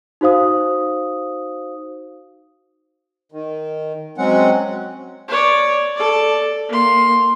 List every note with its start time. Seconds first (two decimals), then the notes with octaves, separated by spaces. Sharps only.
0.21 D#4 F#4 C5 F5 D#6
3.32 D#3
4.18 F#3 G#3 C4 C#4 F#5
5.28 C#5 D5
5.96 A4 D5
6.69 A#3 C6